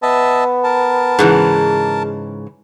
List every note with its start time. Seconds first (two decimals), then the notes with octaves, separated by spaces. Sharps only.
0.02 B3 D#5 E5 A5
0.64 A#4 A5
1.19 G#2 C#3 E3 G#4